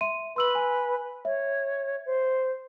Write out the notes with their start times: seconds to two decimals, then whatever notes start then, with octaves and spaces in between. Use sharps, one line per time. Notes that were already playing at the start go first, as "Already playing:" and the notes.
0.01 E5 C6 D#7
0.36 B4 C6 E6 F#7
0.55 G#5
1.25 C#5 E5
2.06 C5